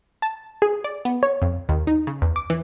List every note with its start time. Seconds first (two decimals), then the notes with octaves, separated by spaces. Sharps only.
0.22 A5
0.62 G#4
0.84 D5
1.05 B3
1.23 C#5
1.42 F2
1.69 D#2
1.87 D#4
2.07 C#3
2.22 E2
2.36 D6
2.50 E3